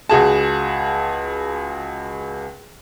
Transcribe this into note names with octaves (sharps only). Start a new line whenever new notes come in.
C#2 F#4 G#4 A5